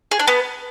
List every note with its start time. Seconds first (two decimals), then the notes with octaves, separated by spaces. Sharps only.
0.11 G#4
0.19 D4
0.27 B3